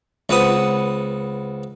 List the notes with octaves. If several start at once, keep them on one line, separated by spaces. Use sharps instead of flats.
C#2 B3 C4 F#5 D#6